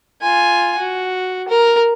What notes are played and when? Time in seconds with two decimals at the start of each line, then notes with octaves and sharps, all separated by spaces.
0.22 F4 G#5
0.78 F#4
1.48 A#4